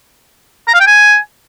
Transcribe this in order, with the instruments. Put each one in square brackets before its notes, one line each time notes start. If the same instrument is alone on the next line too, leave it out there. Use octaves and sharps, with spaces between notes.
[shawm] A#5
F5
G5
G#5